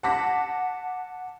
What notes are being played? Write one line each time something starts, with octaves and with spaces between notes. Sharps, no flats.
F#5 A5 D6 A#6 B6